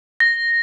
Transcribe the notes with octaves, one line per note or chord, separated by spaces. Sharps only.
A#6